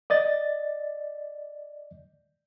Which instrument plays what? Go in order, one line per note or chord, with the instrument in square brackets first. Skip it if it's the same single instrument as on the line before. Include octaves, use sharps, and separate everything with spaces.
[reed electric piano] D5 D#5 A6